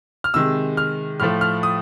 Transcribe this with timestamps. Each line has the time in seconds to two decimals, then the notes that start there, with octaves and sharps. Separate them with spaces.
0.24 F6
0.34 C3 D#3 G#3 E6
0.77 F6
1.20 A2 F3 A3 F6
1.41 F6
1.63 D#6